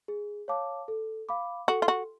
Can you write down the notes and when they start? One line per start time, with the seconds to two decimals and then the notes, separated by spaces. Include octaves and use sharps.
0.08 G#4
0.48 C#5 F5 A5 D6
0.88 A4
1.29 F5 B5 D6
1.68 F#4 A4
1.82 F4
1.88 F#4